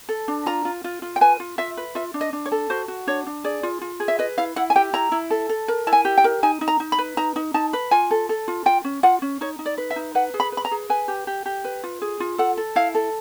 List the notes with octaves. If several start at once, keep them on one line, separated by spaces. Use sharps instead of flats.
A4
D4
F4 A#5
F4
F4
F4
G5
B4 G#5
F4
F4 E5
B4
F4 E5
D4
D#5
D4
C#5
A4
F#4 C5
F#4
D4 C#5
D4
G#4 D5
F4
F4
G#4
E5
B4 D#5
E4 F5
E4 F#5
G#5
G4 G5
E4 A#5
E4
A4
A4
A#4
E4 A5
G#5
G4
G5
A#4
D#4 G#5
D#4
A#5
D#4
B5
B4
D#4 A#5
D#4
D#4 A5
B4
F4 G#5
A4
A4
F4
F4 G5
C#4
F4 F#5
C#4
D#4 C#5
D#4
D5
B4
E5
D#4
B4 F#5
G#4
B5
B4
B5
A#5
G#4
B4 G#5
G4
G4
G4
B4
F4
G#4
F4
A4 F#5
A4
E4 F5
A4